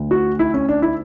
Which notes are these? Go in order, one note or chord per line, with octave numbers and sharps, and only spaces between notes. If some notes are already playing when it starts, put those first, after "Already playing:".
Already playing: D2 D3
F#4
E4
C#4
D4
E4